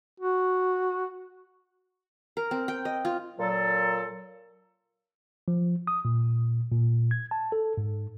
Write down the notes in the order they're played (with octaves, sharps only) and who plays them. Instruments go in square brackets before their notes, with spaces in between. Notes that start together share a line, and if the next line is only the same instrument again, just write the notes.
[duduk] F#4
[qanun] A#4
C4
G5
D#5
F4
[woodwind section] A#2 F#3 A4
[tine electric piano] F3
D#6
A#2
A#2
G#6
A5
A4
G#2